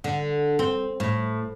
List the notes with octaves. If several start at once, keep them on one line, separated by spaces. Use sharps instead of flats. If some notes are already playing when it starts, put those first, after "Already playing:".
D3
C4
A2